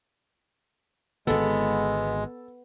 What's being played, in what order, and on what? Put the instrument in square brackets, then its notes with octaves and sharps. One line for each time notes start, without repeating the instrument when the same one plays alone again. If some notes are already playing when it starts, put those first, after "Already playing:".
[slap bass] G#1 D3 [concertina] G#3 [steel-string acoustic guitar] B3 [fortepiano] A4